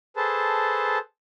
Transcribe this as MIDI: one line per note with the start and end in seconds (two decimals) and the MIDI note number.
0.17 0.98 68
0.17 0.98 69
0.17 0.98 71
0.17 0.98 72
0.17 0.98 81